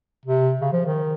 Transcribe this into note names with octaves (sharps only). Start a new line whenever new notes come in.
C3
C#3
F3
D#3